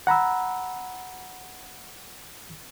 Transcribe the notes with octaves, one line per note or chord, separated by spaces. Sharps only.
F#5 A#5 B5 E6